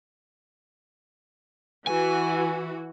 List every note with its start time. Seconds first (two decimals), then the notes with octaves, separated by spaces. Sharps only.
1.87 E3 F#4 G#5